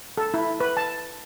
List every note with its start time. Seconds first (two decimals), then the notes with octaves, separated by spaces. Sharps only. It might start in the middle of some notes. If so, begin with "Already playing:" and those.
0.18 A4
0.34 E4
0.60 B4
0.77 A5